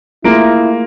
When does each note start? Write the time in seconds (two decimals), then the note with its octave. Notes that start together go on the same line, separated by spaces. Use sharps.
0.24 A3 A#3 E4 F4 G#4 A#5 D7